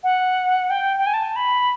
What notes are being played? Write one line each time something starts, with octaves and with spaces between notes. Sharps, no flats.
F#5
G5
G5
G#5
A5
B5